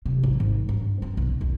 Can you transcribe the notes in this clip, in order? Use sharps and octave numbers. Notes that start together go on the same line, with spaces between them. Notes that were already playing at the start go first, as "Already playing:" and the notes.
C3
A1
G#1
G2
C4
B1
D#2